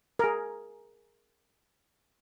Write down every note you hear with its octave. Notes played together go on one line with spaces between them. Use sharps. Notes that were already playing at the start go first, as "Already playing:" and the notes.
G#4 A#4